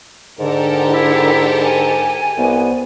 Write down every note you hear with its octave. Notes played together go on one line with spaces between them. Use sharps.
G#2 D3 G4 A4 A#4
E4
G#5
C2 B3